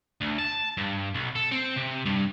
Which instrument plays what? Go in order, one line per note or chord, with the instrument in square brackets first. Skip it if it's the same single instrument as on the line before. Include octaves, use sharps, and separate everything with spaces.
[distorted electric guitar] D2
A5
G2
B1
A4
C4
C3
G2